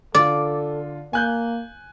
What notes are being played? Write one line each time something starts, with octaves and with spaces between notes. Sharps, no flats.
D3 F4 A4 D5
A#3 G#5 F#6 G6